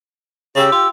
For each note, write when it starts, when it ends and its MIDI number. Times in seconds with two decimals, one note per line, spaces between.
0.56 0.70 49
0.56 0.87 67
0.56 0.87 79
0.56 0.87 88
0.72 0.88 65